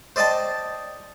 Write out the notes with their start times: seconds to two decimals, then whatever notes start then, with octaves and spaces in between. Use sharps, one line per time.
0.16 C5 D5 D#5 G5 A5